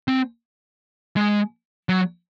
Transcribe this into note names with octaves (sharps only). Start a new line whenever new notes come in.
C4
G#3
F#3